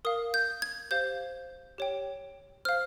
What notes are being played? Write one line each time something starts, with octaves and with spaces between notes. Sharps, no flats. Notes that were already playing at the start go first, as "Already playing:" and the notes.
A#4 F5 D#6
G6
G#6
G4 C5 F5 G6
G4 C#5 G5
C5 F5 F6